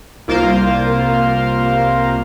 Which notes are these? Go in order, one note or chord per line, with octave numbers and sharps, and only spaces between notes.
C2 A#3 F4 A#4 C5 F5